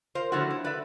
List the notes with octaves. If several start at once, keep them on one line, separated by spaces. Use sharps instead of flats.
F4 A#4 C5
D3 F3 F#3 A3 E4 F#4
E4
B4 D5 E5